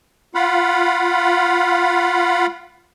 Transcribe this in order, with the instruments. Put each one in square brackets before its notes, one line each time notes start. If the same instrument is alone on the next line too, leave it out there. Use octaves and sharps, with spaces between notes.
[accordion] F4 F5 F#5 B5